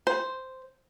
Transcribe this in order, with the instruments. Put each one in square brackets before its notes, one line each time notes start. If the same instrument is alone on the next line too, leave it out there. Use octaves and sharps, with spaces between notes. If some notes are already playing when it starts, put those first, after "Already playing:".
[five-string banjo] C5